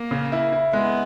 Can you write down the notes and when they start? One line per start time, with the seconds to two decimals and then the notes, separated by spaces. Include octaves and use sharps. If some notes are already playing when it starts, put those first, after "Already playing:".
Already playing: A#3
0.11 C#3
0.32 E4
0.52 E4
0.73 G#3 B3